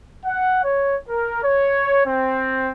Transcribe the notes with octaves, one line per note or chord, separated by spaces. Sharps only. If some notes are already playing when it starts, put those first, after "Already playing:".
F#5
C#5
A#4
C#5
C4